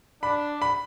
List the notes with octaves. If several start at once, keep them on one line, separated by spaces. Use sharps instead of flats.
D4 B5
B5